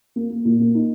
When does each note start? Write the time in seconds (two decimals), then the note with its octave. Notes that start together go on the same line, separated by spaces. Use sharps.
0.16 A#3
0.30 A#3
0.45 A#2
0.60 A#3
0.75 D#4